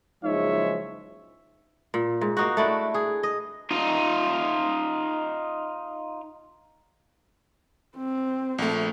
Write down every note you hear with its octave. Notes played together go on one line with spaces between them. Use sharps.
F#1 F3 G#3 D#4 C#5 E5
A#2
G#2
A#3 D#4 F#4
A3 D4 E4
G#4
D#5
D#4 F4
C4
A#1 A3